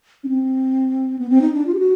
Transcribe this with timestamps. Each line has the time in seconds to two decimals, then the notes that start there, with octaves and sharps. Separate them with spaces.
0.24 C#4
0.29 C4
1.19 B3
1.30 C4
1.42 D#4
1.54 D4
1.67 F4
1.74 G4
1.79 F#4